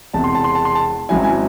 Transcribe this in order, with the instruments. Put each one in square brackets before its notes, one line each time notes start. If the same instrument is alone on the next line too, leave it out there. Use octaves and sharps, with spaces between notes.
[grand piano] E1 E2 C3 A5
C6
A5
C6
A5
C6
A5
G#1 G#2 F#3 C#4 E4 G#5
G#5